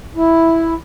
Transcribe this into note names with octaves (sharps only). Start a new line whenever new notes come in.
E4